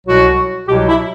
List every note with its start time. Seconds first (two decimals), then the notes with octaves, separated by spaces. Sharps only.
0.06 C2 B2 F#3 F#4
0.67 C2 B2 F#3 G4
0.88 E4